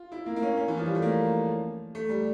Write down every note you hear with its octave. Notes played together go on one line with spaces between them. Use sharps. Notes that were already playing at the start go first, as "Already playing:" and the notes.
Already playing: F4
E4
A#3
A#3
C#4
C#4
E3
F3
G3
A3
A#3
A3
G3